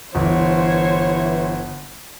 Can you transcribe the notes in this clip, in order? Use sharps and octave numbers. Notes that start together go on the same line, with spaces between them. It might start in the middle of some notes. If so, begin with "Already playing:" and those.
G1 E3 C5 C#5